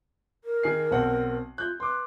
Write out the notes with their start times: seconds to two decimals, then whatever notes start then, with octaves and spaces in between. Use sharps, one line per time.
0.44 A#4
0.63 D#3 G#4 C7
0.91 B1 C4 F#5
1.58 F4 F#6 G6
1.80 B4 C6 D6